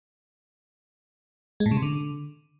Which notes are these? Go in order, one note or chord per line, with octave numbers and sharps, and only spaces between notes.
G#3
A2
C#3
C3
D3